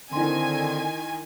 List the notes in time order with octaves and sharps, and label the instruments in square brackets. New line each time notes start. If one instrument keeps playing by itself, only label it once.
[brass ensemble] D3 C4 [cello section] D#3 [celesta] E4 C6 [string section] G#5